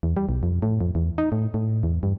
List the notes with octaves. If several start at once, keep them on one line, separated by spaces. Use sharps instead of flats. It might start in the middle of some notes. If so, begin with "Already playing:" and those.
E2
G3
B1
F2
A2
F2
E2
D#4
A2
A2
E2
G2